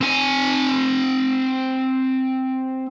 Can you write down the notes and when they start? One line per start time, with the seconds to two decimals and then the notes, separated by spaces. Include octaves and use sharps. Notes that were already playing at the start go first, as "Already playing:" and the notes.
0.01 C4 G#5